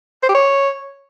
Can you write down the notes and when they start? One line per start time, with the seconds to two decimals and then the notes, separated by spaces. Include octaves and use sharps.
0.23 C5
0.29 G4
0.35 C#5